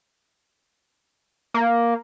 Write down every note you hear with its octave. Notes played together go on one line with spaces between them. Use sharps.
A#3